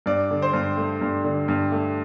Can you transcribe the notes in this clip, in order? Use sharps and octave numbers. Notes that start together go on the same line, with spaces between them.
G2 D5
D3
C5
G2
A3
G2
D3
G2
A3